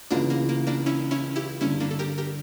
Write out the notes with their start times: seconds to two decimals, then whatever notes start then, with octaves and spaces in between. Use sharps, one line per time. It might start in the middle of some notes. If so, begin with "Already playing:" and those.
0.11 C#2 C#3 E3 A#3 D4
0.30 A#3
0.49 A#3
0.67 A#3 D4
0.86 C#4 E4
1.11 C#4 E4
1.36 E4 G4
1.61 G2 D3 G3 C#4 E4
1.80 A#3 D4
1.91 A4
1.99 G4 A#4
2.18 G4 A#4